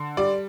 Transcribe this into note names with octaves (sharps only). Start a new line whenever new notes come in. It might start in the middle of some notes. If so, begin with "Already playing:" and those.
Already playing: D3
G3 D5